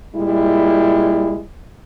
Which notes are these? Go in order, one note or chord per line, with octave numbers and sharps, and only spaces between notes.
A#2 G3 G#3 E4